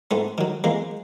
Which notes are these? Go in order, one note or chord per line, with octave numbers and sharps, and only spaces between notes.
G#2 A3 B3
D#3 F#3
E2 G#3 A#3